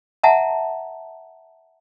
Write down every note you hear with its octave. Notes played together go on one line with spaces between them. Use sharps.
E5 F#5 A5 A#5